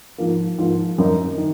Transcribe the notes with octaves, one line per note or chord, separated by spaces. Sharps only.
G#2 F3 A#3
G#2 F3 A#3
F#2 D#3 A#3 D#4
D#3